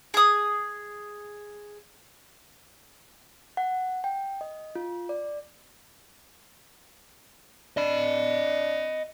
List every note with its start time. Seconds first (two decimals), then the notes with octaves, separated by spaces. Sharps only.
0.14 G#4 D#6
3.57 F#5
4.04 G5
4.41 D#5
4.76 F4
5.09 D5
7.77 D4 D#5 B5